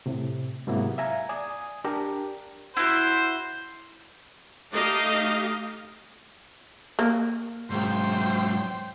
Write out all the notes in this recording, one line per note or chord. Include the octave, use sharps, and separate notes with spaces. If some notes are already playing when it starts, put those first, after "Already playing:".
A2 C3
G#2 C3 F#3 A#3 B3 E4
E5 F5 G#5 A#5
D5 G#5 D#6
D4 G4 A#4
E4 F#4 C5
A3 D#4 G4 D#5 F5
A#3
G#2 F#3 C5 G5